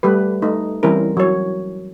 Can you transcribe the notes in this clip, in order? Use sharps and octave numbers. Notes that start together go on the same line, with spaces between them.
G3 A3 G4 B4
A3 D#4
E3 G3 C4 C#4 E4 A#4
F#3 C#5